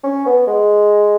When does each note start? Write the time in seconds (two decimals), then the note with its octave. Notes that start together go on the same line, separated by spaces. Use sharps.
0.04 C#4
0.26 B3
0.47 G#3